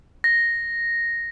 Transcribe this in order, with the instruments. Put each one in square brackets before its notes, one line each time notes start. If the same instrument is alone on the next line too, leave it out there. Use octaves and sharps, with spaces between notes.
[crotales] A#6